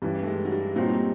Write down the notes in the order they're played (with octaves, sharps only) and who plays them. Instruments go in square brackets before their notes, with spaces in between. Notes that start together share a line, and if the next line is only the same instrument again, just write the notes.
[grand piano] G2 E3 G3 [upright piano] C#4
[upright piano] A3
G#3
F#3
G3
[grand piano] A#2 G3 C4 D#4 [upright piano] F#3